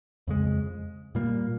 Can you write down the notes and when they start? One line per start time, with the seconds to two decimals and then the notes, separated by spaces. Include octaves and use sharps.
0.27 F2 C#3 G#3
1.15 A#2 G3 A#3